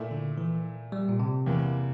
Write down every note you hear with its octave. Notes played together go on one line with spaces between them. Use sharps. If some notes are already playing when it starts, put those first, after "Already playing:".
Already playing: A#2 A3 E4
D3
E3
G3
A#2
C3
E2 E3 A#3